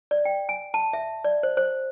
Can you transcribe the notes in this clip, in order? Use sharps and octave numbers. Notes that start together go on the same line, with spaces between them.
D5
G5
G#5
A5
E5
D5
C5
C5